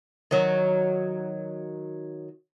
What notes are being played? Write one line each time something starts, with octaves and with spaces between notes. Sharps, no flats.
D#3 F#3